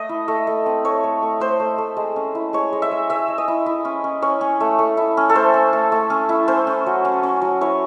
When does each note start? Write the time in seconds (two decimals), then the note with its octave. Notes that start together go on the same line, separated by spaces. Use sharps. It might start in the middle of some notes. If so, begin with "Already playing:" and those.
Already playing: A3 D#5
0.09 E4
0.28 A3
0.47 A3
0.66 C4
0.84 A3 C#5
1.04 A3
1.22 A3
1.40 A3 C5
1.60 A3
1.78 A3
1.97 G#3
2.16 C#4
2.35 E4
2.53 G#3 C#5
2.73 G#3
2.82 E5
2.91 G#3
3.10 G#3 E5
3.28 G#3
3.38 D#5
3.48 E4
3.66 E4
3.85 C#4
4.04 C#4
4.22 C#4 C#5
4.41 C#4
4.60 A3
4.79 A3
4.97 E4
5.17 C#4
5.29 A4
5.35 A3 C5
5.54 C#4
5.73 A3
5.92 A3
6.10 C#4
6.29 E4
6.48 C#4 C5
6.67 C#4
6.86 F#3
7.05 C#4
7.23 C#4
7.42 F#3
7.61 E4 C#5